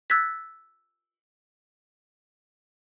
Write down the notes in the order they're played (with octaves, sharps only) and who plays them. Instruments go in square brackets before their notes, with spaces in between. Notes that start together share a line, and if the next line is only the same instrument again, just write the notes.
[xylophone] E6 F#6 G#6 A6 B6